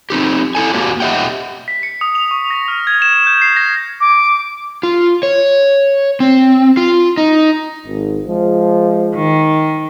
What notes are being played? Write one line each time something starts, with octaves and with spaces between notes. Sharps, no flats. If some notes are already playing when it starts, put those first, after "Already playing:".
C4 D#4 G4
E4 A4 G#5
A#3 D4 F#4 G4
G4 D#5 E5 F#5 G5
B6
C#7
D#6
F7
C#6
A#6
F6
G#6
E7
G6
C7
A#6
D6
F4
C#5
C4
F4
D#4
G#1
F3 G#3
D#3